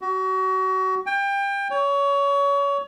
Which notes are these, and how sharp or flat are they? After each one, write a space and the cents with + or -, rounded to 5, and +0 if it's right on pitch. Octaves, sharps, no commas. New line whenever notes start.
F#4 +30
G5 +25
C#5 +25